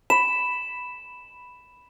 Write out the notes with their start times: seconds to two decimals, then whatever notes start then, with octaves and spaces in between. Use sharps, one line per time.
0.10 B5 E7